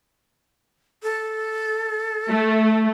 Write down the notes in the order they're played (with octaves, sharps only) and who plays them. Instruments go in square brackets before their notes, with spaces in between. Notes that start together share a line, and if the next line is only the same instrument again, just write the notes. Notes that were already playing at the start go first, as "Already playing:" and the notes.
[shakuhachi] A4
[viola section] A3